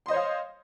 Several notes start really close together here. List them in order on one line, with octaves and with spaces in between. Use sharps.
C6 D#5 C5 C#5 F5